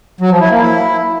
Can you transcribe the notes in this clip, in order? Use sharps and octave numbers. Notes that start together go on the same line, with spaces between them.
F#3
F3
E4
A#3
E4